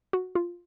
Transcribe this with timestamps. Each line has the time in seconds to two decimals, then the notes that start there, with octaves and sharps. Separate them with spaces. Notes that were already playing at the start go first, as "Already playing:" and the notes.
0.13 F#4
0.35 F4